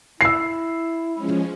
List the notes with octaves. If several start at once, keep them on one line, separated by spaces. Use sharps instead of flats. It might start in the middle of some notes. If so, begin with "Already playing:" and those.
E4 E6 C7
F3 G#3 C#4